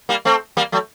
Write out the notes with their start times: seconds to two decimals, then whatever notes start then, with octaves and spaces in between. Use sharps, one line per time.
0.09 G3 A#3
0.25 A3 C4
0.57 G3 A#3
0.72 F#3 A3